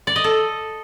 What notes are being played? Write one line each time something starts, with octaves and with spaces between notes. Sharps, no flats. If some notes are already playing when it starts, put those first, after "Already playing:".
D5
D#5
A4